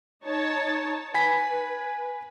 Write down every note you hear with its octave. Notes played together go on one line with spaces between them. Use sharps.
D#4 C#5 A5
B4 G#5 B5 B6